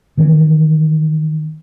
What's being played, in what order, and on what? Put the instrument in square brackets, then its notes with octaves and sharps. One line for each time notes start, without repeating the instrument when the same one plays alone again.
[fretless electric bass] D#3 E3 C4